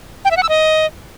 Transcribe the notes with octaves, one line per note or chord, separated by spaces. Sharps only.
G5
E5
F#5
E6
D#5